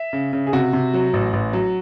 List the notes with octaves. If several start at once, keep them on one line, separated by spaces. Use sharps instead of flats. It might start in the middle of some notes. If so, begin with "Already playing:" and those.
Already playing: E5
C#3
C#3
G#4
C3 F#4
C3
F#3
A1
A1
F#3